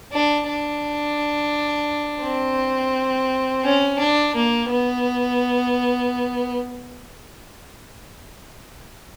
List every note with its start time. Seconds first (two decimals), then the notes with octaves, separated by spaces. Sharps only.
0.12 D4
0.48 D4
2.23 C4
3.64 C#4
3.99 D4
4.35 A#3
4.70 B3